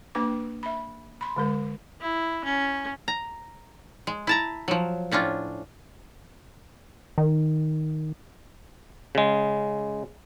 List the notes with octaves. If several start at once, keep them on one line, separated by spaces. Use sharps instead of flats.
A#3 D4 B4 D6
E5 B5
B5 C6
D3 G#3 A#4
E4
C#4
A#5
G#3
E4 A5 A#5
F3 F#3
A2 C#4 D4 F4
D#3
C#3 G#3